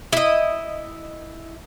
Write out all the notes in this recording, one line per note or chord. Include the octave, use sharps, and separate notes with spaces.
E4 D#5